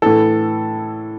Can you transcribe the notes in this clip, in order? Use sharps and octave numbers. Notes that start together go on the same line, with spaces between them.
A2 E3 A4